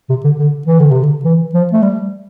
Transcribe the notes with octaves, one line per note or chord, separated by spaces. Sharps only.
C3
D3
D3
E3
D3
C3
D3
E3
F3
A3
G3